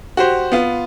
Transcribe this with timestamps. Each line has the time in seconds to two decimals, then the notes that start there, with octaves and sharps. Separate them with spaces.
0.17 F#4 G4 C5
0.52 B3 F4